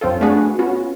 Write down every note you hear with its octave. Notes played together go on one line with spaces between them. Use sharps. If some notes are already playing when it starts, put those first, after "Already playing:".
F#2 C4 C#4 F4 A4
A3 B3 D4 F#4 G#4 B4
B3 C#4 F4 F#4